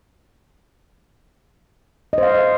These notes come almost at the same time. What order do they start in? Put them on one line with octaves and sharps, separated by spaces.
D#5 C5 F5